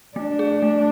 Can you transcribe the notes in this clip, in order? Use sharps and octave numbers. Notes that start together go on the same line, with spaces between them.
A3 D4
G#4
A3